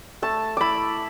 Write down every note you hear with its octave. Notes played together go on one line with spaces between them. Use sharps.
A3 A5
E4 B5 D6